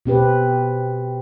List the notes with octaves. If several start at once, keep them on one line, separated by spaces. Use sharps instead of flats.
B2 C4 G4 B4